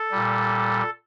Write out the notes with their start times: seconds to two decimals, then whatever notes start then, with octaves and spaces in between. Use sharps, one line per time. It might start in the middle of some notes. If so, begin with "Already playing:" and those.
Already playing: A4
0.11 A#2 G3